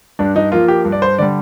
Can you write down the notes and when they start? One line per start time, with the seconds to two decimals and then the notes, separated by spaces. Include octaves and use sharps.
0.19 G2 D4
0.36 D#4
0.52 F3 A#3 F4
0.68 G4
0.85 G2
0.92 D5
1.02 C5
1.18 D3 G3 D5